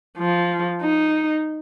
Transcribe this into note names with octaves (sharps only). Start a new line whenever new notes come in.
F3
D#4